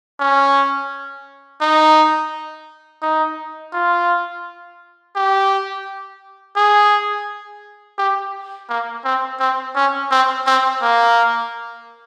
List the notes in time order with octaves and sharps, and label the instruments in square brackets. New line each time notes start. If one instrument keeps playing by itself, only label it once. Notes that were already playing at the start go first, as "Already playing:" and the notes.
[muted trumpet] C#4
D#4
D#4
F4
G4
G#4
G4
A#3
C4
C4
C#4
C4
C4
A#3